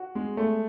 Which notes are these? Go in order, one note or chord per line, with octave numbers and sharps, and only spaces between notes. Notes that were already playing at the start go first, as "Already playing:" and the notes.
Already playing: F#4
G#3
A3